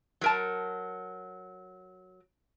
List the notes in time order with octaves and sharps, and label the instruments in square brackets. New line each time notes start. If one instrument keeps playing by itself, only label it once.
[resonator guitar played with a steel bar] F#3 A#4 A5